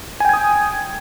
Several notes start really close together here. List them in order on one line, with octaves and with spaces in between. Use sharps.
G#5 G5 G#6 D#6